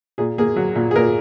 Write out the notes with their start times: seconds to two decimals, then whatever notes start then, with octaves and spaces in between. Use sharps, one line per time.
0.18 A#2 G#4
0.38 A#3 G#4
0.56 F#3
0.75 A#2
0.91 G#4
0.96 A#2 A#4